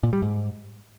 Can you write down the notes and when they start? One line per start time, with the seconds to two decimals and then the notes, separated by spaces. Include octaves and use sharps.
0.03 A#2
0.13 G3
0.22 G#2